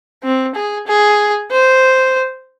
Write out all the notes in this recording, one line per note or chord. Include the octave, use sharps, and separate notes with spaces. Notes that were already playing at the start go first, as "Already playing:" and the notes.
C4
G#4
G#4
C5